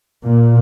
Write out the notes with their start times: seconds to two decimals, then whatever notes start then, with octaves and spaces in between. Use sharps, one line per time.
0.25 A#2